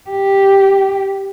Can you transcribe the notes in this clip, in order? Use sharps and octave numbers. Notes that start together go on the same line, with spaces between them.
G4